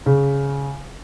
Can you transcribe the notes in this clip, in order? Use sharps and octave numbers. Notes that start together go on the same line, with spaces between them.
C#3